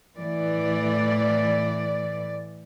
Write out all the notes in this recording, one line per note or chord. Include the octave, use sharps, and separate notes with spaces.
A2 E3 D5